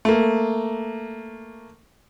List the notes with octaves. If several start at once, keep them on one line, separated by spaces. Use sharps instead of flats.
A3 A#3